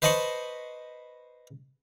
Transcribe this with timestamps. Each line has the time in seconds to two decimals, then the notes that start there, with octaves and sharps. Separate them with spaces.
0.02 B4 C5 D#5 A5 B5 C#6